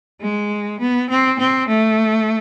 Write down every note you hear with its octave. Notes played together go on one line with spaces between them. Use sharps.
G#3
B3
C4
C4
A3